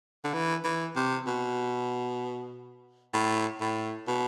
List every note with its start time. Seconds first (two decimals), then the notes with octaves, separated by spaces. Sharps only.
0.24 D3
0.33 E3
0.64 E3
0.96 C3
1.27 B2
3.13 A2
3.61 A2
4.07 B2